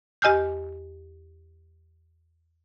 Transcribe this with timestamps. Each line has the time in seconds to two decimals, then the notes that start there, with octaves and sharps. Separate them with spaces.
0.22 E2 G4 D#5 G#5 F6 G6